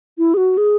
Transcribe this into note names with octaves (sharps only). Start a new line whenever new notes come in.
E4
G#4
F#4
G#4